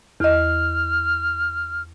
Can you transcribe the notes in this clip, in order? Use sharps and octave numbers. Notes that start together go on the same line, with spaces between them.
E2 D#5 F6